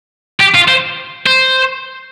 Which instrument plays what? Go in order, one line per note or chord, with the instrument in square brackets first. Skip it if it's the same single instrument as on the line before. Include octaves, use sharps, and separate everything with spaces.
[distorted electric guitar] G4
F4
C5
C5